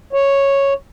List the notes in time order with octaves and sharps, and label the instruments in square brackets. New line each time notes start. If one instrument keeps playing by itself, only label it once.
[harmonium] C#5